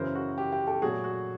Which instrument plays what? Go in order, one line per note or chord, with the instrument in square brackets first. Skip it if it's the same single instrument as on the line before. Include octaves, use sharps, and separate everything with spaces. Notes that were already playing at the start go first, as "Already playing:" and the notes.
Already playing: [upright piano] F#2 C#3 E3 A#4 C5
F#4
G4
G4
G4 A4
A#2 F#3 A3 F#4 G#4
F#4